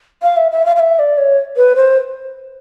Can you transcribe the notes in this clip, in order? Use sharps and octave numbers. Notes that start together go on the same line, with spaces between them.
F5
E5
E5
F5
F5
E5
D5
C#5
B4
C5